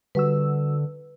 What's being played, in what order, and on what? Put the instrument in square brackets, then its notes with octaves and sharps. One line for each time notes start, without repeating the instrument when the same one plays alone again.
[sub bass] D3 [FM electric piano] G3 F#4 E6 [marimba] B4